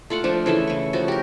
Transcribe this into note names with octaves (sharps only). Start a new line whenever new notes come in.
A3 F4 D5 F#5
F3 A3 D4
C#3 E3 A3 E5
C#3 C#6
F3 F#4
G4 A#4